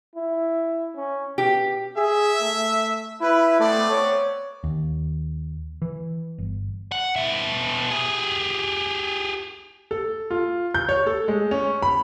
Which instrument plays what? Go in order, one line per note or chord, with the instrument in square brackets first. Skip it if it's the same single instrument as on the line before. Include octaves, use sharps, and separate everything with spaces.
[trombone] E4
C#4
[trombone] B2 [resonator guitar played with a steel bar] G4
[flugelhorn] G#4 [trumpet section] E5
[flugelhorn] A3
[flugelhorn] E4 [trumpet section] B4
[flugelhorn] A3 [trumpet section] B3 C4 D5
[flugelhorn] C#5
[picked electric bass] D#2
E3
G1
[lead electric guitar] F#5
B2 E5
G4 G#4
[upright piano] A4
F4
G6
C#5
A4
G#3
C#4
B5